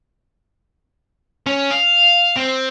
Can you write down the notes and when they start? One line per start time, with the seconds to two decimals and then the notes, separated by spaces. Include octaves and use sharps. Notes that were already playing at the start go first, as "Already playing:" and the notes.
1.47 C#4
1.71 F5
2.37 C4